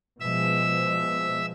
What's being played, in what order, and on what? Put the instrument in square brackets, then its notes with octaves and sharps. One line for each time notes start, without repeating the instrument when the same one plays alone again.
[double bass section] B2 F3 G#3 [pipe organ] E5 E6